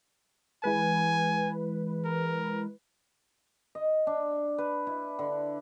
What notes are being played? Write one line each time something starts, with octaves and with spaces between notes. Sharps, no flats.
E3 G#3 B4 G#5
A#4
D#5
D4
B4
E4
D3